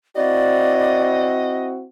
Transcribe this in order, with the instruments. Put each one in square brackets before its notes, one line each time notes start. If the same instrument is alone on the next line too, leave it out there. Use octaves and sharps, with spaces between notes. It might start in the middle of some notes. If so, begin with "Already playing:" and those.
[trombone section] C4 E4 F#4 [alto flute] D5 [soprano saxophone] D#5